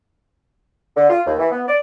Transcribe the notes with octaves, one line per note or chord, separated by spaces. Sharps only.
D3
F4
D#2
E3
B3
D5